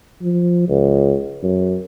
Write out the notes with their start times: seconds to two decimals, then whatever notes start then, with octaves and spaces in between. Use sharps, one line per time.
0.22 F3
0.69 C#2
1.43 F#2